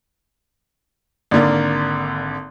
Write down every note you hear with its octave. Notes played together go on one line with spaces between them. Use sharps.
G#1 D3 A#3 D5